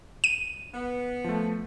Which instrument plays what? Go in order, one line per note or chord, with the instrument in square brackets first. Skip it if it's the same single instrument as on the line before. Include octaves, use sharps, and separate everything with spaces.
[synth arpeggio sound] D#7
[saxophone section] B3
[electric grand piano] F3 A3